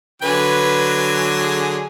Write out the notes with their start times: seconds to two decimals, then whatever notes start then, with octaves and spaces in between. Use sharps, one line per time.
0.22 D3 F#3 B4 G#5
1.41 G#4